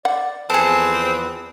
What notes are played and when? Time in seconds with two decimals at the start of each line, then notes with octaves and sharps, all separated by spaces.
0.05 D5 F#5
0.50 E2 F3 C4 G#4 A4 B4